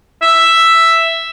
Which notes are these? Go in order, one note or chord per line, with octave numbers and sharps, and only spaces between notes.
E5